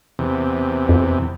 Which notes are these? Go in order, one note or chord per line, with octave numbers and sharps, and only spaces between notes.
E2 C3
F2